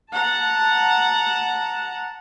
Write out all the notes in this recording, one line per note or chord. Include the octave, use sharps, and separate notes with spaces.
F#5 A5 A#5